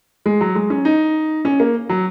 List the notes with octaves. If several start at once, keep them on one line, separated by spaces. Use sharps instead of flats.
G#3
F#3
G#3
C#4
D#4
C#4
A#3
F#3